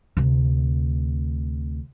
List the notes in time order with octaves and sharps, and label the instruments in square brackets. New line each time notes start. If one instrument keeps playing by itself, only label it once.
[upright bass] D2 C3